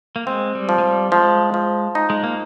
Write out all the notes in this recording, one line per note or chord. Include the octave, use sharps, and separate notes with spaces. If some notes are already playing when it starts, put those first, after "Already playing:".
A#3
G#3 C4
G3
F3
G#3
G3
F3 G#3
F3
D#4
G#3
A#3